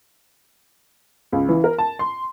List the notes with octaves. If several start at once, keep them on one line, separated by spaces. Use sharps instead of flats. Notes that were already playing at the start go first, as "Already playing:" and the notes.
C#2
E3
A#4
A5
C6